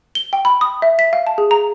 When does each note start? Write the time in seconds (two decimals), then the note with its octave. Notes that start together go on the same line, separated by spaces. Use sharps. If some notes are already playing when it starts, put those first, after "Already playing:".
0.15 G7
0.33 G5
0.45 B5
0.61 D#6
0.82 E5
0.99 B6
1.13 F5
1.27 A5
1.38 G#4
1.51 A#5